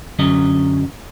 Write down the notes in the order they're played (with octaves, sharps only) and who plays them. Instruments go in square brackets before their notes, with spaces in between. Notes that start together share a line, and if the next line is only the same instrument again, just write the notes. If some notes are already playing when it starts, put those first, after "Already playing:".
[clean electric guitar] F#2 D3 F#3 C#4 D#5